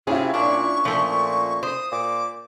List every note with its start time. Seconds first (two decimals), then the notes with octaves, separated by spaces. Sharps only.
0.07 C3 C#4 E4 F4 G#4
0.34 A#2 D4 C#6
0.85 A#2 F3 A3
1.63 C5 D#6
1.92 A#2 D6